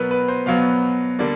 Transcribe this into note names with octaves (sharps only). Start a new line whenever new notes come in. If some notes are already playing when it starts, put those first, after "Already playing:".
Already playing: B2 F#3 B3 A#4 B4
B4
C5
B2 F#3 B3 F5
D3 G3 A#3 D5